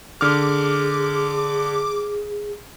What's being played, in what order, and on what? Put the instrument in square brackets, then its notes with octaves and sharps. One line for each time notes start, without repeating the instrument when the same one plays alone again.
[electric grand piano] D3 F6 [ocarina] G#4 [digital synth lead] D6